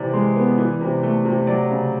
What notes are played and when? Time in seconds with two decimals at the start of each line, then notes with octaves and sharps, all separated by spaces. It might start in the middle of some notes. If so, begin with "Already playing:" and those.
Already playing: C3 E3 D5
0.13 G#3
0.36 B3
0.58 E3
0.81 C3
1.03 A3
1.25 C3
1.47 F#3 D5
1.70 C#3